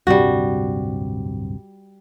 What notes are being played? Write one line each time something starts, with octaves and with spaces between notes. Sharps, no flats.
D1 G2 C3 G3 F#4